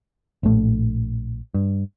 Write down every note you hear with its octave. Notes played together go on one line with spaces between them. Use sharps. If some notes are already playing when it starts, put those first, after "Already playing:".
A#1 A2 A3
G2